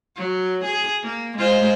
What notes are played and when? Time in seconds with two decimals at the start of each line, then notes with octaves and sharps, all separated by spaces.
0.16 F#3
0.64 G#4
1.03 A#3
1.37 G#3 F4 C5